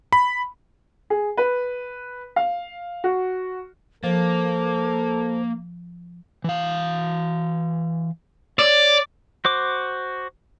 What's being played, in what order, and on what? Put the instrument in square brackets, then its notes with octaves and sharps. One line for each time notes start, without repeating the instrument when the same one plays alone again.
[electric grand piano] B5
[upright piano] G#4
B4
F5
F#4
[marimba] F3 [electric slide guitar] A#3 [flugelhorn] A4 [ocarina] C5
[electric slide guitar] E3 F5
[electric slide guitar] C#5 [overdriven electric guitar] D5
[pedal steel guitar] F#4 C5 D6